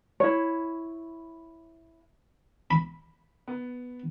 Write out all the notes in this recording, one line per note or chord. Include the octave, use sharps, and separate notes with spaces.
E4 C#5
B5
B3